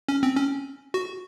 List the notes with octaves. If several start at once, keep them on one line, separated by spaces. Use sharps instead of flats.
C#4
C4
C#4
F#4